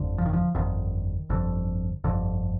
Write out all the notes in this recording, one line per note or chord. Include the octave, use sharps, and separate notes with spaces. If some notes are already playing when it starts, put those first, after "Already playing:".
Already playing: G1 F2 D3
F3
D#3
F3
G1 F2 D3 D#3
G1 F2 D3
G1 F2 D3